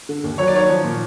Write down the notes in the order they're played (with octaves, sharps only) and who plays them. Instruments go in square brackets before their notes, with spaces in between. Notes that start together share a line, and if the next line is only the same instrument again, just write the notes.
[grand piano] D3
D#2
F#3 C#5
D5
D#3 C#5
F3
A#2